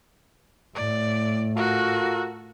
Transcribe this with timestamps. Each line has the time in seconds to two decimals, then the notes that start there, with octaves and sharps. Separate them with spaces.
0.75 A2 D5
1.57 F4 F#4 A4 A#4